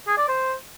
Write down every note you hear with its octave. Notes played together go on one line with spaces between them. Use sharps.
G#4
D5
C5